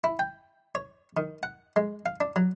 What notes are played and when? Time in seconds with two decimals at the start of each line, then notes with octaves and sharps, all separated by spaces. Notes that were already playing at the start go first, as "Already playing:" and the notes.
0.04 E4
0.19 G5
0.75 C#5
1.17 D#3
1.43 F#5
1.76 G#3
2.06 F5
2.21 D4
2.36 F#3